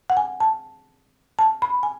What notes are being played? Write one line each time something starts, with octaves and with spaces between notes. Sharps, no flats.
F#5
G#5
A5
A5
B5
G#5